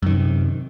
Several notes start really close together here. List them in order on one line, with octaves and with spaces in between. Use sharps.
F#2 D#3 C3